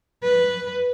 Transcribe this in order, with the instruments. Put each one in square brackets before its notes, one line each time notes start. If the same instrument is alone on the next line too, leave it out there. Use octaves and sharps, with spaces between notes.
[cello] B4